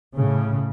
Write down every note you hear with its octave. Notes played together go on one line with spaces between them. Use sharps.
A2 C#3